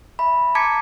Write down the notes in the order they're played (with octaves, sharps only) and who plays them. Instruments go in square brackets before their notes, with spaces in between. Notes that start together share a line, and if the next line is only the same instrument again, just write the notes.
[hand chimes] E5 B5
A5 A#5 D6 G#6 B6 C#7